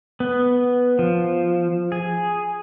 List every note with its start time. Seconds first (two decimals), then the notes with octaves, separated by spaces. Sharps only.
0.20 B3
0.99 F3
1.92 G#4